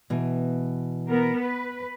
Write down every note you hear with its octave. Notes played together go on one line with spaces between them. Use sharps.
B2 E3
B3 A#4
B4